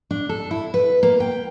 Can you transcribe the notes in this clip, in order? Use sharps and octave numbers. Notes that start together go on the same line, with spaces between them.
D4
A4
E4
B4
A#3
G5